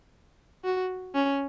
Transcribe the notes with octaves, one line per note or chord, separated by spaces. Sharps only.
F#4
C#4